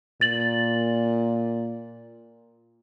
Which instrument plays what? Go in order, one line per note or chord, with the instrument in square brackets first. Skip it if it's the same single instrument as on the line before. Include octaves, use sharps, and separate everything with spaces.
[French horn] A#2 [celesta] A6 F#7